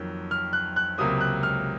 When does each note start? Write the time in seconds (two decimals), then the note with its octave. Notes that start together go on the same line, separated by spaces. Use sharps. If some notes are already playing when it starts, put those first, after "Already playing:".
Already playing: F2 D#3 F#3 A#3
0.31 F6
0.53 F#6
0.76 F#6
0.98 C#2 C3 F#3 A#3 D#6
1.21 F#6
1.43 F6